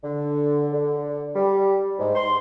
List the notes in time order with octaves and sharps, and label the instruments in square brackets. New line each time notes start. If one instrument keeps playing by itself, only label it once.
[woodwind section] D3
D3
G3
G#2
C6